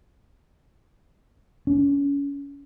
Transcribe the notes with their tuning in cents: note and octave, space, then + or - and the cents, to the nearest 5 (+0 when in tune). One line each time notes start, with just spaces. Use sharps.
C#4 +30